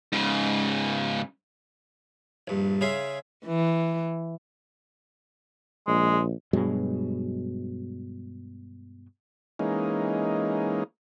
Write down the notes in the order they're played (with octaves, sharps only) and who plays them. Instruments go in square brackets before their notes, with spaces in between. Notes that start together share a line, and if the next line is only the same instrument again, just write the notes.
[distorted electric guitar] G#2 C#3
[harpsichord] A#1 G2
C#3 G#4 E5 F5 C6
[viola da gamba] E3
[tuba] A#1 [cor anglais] G#3
[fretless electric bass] G2 B2 F#3 G#3
[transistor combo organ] E3 G#3 A#3 C#4 D#4